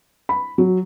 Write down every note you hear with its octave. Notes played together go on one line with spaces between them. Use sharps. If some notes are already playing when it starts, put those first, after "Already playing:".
B5
F#3